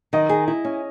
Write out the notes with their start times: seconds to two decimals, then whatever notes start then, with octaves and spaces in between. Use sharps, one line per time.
0.13 D#3 D#5
0.29 G#4
0.48 E4
0.65 C#4